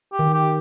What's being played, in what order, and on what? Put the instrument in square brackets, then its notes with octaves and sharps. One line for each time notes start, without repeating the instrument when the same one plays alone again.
[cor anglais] G4
[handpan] D#3
[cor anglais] G4